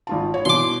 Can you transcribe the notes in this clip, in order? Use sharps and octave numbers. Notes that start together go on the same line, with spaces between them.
G#1 F4 A5
C#5
B2 E3 C6 D6